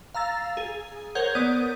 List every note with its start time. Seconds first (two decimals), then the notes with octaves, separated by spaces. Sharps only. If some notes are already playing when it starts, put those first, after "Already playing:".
0.14 F5 A#5 E6 A6
0.57 G#4
1.15 A#4 C5 C#5 F#5 G6 G#6
1.35 B3 D5 D#6 G6 D#7